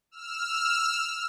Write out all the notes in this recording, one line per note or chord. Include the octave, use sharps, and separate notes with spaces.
E6 F6